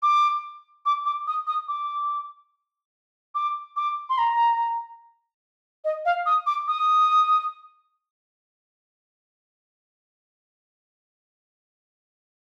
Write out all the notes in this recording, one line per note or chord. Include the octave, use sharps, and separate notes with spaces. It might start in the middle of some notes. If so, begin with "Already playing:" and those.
D6
D6
D6
D#6
D#6
D6
D6
D6
C6
A#5
D#5
F5
D#6
D6
D#6